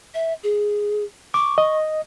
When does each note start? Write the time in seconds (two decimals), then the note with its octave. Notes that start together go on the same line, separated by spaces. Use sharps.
0.14 E5
0.43 G#4
1.34 C#6 D6
1.58 D#5